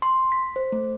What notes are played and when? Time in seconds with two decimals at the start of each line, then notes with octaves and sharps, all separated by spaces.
0.02 C6
0.32 B6
0.56 C5
0.72 A3